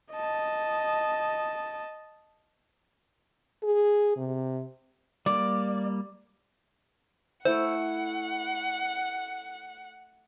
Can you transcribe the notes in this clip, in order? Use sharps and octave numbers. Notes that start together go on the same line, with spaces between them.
D#5 A5
G#4
C3
G3 A#3 D5
A3 E4 C5 F#5